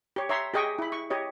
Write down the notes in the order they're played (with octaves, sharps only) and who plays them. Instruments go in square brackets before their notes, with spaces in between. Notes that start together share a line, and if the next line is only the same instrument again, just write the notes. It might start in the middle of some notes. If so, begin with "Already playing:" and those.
[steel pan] G4 C#5
C#5 E5 A#5 C6
G4 G#4 D#5 G5 C#6
E4 B5
C#6
G4 C#5 D#5